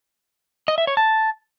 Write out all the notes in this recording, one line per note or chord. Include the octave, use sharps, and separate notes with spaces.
D#5
E5
C#5
A5